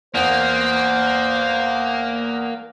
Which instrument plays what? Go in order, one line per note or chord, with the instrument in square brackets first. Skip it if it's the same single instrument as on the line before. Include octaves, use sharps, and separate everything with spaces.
[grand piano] E2 [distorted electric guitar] A#3 [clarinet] C5